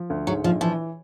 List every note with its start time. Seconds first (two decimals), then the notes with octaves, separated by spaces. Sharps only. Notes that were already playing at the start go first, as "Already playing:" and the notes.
Already playing: F3
0.10 D2
0.27 G#2 F#3
0.44 A#1 F3
0.61 E3 F3